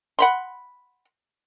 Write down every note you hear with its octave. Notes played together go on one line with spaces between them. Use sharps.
F#5 B5 C6